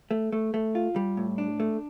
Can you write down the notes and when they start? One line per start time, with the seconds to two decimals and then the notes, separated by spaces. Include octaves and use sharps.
0.11 A3
0.33 A3
0.54 A3
0.75 F4
0.96 G3
1.17 A2
1.38 D4
1.60 A3